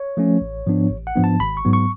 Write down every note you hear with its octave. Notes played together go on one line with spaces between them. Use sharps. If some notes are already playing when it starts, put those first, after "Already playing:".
Already playing: C#5
F3 A3 C#4
A1
G#2 F3 B3 D4
A1
F#5
G#2 F3 B3 D4
A5
G#1 B5
C#6
G#2 F#3 B3
C#6